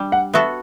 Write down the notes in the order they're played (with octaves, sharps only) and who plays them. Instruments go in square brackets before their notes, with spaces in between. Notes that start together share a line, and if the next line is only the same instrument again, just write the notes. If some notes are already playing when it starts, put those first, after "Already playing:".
Already playing: [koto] G3 D4
[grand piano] F#5
[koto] B3 F#4 A4 [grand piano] E5